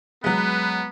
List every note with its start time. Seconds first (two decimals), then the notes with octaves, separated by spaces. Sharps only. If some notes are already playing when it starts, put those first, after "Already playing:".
0.24 F#3 G#3 B3 B4